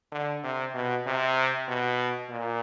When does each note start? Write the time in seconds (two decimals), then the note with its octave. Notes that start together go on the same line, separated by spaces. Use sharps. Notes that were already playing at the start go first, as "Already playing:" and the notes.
0.12 D3
0.44 C3
0.74 B2
1.06 C3
1.68 B2
2.30 A#2